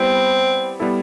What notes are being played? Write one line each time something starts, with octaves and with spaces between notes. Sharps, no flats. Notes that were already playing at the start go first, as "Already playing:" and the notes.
Already playing: G3 B3 C4 E4
G3 B3 E4 A4